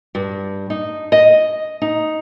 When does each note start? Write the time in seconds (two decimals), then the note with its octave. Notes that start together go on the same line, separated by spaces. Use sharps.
0.15 G2
0.70 D#4
1.12 D#5
1.82 D#4